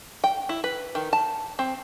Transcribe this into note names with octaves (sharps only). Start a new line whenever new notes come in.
G5
E4
B4
D#3
A5
C4